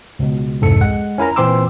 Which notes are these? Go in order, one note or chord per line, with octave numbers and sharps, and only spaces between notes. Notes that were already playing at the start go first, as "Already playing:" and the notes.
C#2 B2
C2 F2 G#2 A4 C#7
G#3 F#5
C#4 E4 A#4 A#5
A#2 E3 C4 C6 D6 E6